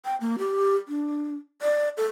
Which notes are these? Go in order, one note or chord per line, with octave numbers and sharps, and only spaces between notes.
G5
A#3
G4
D4
D5
A4